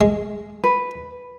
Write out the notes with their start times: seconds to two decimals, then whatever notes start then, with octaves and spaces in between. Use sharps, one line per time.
0.01 G#3
0.64 B4